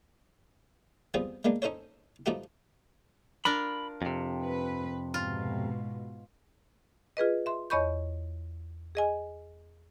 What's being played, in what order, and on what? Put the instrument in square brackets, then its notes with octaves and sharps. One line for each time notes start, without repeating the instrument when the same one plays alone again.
[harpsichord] F3 G3 B3 C4 G#4
G#3 A#3 B3 D4
C#4 D#4 A4 C5 C#5
G2 F3 A3 D#4 F#4 G4
[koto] D4 F4 A#4 [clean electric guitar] B5
[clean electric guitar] F2 C3
[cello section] B4
[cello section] G#2 B2 [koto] F4
[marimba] F4 G#4 B4 D#5
E5 C6
E2 C#5 D#5 B5 C#6 G6
G#4 D#5 G#5